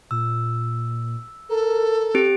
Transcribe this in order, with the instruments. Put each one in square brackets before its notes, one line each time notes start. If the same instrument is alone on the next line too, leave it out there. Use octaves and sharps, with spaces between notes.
[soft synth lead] A#2 [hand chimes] E6
[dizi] A4 [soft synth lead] A#4
[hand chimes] C4 G4 D7